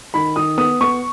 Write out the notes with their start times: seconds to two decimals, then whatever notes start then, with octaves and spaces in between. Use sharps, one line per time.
0.14 D#3 B5
0.36 D#3 D#6
0.58 B3 D#6
0.81 B3 C#6